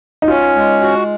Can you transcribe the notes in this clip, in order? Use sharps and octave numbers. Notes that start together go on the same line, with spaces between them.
D#4
C#4 F4
G#3
F#4